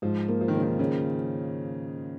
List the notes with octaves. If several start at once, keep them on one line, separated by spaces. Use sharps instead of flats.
G#2 F3
A#3
F3
D#3
C#3 A#3
D#3
C#3 C#4